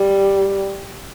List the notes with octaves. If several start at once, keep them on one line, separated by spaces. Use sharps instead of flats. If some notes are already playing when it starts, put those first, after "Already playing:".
Already playing: G3